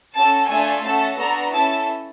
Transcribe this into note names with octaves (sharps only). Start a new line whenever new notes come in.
C#4 F#4 A4 A5
A3 D4 F4 A4 G#5
A3 C#4 F#4 A4 A5
B3 D4 F#4 A4 A#5
C#4 E4 A4 A5